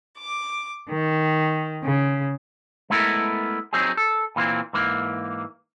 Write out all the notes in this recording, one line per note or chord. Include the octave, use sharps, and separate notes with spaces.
D6
D#3
C#3
G#3 A3 B3 E4 A4 A#4
F#3 C4 D#4 G#4
A4
A#2 E3 A#3 C4
G#2 E3 A#3